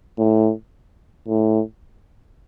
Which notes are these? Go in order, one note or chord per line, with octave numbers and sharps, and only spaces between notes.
A2
A2